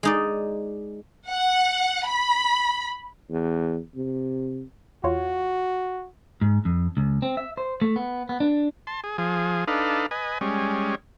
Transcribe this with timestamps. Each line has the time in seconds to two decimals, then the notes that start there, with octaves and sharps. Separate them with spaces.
0.03 G#3 D#4 D5
1.28 F#5
2.08 B5
3.30 E2
3.95 C3
5.04 E2 F4 F#4 C#5
6.41 G#2
6.65 F2
6.97 C#2
7.22 C4
7.37 E5
7.57 C5
7.82 A3
7.96 B3
8.29 B3
8.40 D4
8.87 A5 C6
9.04 G#4
9.18 F3 G#4
9.68 D4 D#4 A4 B4 F5
10.11 B4 D#5 G#5
10.41 G3 G#3 C#4